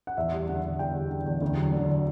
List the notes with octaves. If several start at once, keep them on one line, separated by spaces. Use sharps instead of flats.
F#5
E2 E5
G3
D3 F#5
E2
E2 G5
G3
D3
E2
D2
F#3
D3